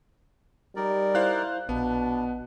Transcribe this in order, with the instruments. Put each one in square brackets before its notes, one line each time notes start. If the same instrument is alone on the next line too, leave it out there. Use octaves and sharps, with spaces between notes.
[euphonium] G3 [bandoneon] D#4 A#4 D5
[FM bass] E4 [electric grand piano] C5 F5 F#6
[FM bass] A#1 [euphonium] B2 [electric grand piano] B3 [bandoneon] D4